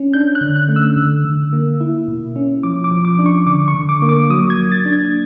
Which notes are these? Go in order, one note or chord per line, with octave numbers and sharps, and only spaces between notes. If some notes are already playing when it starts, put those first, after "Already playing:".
Already playing: C#4
D4 G6
F#6
D3
F#6
A3
E6
D3
D3
A#3
E4
B2
C#4
F3 D6
D6
F3
D6
D4
C#6
D3 D6
C#6
D3
D6
A#3
D6
F#3 D#6
G#6
F#3
A6
D4
G#6